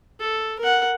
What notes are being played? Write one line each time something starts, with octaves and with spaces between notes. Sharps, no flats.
A4
A#4 F#5